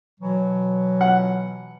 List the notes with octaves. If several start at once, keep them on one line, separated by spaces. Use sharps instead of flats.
B2 E3 F#3
F#5